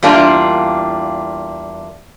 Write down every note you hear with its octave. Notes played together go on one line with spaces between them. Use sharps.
E2 G3 A#3 D4 F4